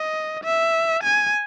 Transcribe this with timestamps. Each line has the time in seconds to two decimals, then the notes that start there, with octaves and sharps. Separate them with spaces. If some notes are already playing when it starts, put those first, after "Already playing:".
Already playing: D#5
0.43 E5
1.03 G#5